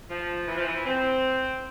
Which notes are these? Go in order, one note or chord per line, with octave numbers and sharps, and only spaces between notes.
F3
E3
F3
E3
C4